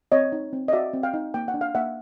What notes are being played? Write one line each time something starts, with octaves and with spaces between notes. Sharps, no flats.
C4 C#5 D#5
D#4
C4
D#5
F#4 D5 E5
C4
F5 G5
D#4
A#3 G5
F#5
D4
F5
A#3 E5 F#5